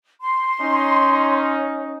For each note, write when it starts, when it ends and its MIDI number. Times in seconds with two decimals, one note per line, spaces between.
0.21 1.47 84
0.61 1.97 61
0.61 1.97 63